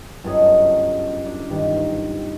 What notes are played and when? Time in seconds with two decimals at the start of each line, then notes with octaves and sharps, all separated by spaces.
0.24 G1 F#2 C#4 A4 D#5
1.25 D4
1.50 G2 D#3